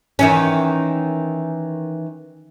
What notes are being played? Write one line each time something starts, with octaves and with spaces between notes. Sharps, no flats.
D#3 E3 C#4